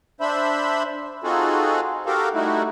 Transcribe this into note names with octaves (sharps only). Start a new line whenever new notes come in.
D4 C5 E5 B5
C4 D#4 F4 F#4 G#4 A4
F#4 G4 A4 A#4 F5
G3 A3 D#4 E4 F#4